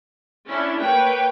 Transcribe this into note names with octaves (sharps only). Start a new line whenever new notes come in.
C#4 D4 E4
A#3 B4 C#5 G5